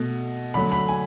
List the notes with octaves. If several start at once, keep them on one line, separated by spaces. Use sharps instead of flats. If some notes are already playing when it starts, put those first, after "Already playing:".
Already playing: B2 A3
D3 F#3 A3 B5
B5
G#5